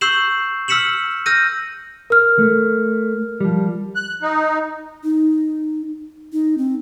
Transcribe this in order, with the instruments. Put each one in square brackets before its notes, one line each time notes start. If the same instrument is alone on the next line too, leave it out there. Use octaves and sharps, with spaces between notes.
[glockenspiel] C#6 E6 G6 C7 E7 F#7
E6 F6 B6 C#7 E7 F#7
E6 F6 G6 A#6 D#7
[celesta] A#4 F6
[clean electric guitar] A3
F3 G3
[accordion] F#6
D#4
[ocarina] D#4
D#4
C4